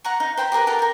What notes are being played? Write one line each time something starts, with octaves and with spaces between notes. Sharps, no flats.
F#5 A#5 C#6
D#4 F5
C5 G5 A#5 B5
G4 G#4 A#4 B4
G4 A4 A#4 F#5
A#4 G5